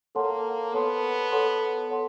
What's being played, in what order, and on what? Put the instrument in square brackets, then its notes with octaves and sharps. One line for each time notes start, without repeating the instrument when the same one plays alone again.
[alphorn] A#3 [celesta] A4 C#5 F#5 A5 C6
[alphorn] B3 [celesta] A4 C#5 F#5 A5 C6
[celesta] A4 C#5 F#5 A5 C6
A4 C#5 F#5 A5 C6